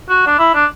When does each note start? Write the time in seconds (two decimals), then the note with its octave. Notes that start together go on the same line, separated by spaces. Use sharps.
0.09 F#4
0.27 D4
0.39 E4
0.54 D4